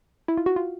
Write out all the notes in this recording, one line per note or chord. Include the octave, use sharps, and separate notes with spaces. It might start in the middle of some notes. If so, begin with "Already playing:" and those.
E4
F4
F#4
F4